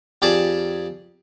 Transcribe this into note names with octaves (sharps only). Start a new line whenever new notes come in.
F2 G4 G#4 D5 A5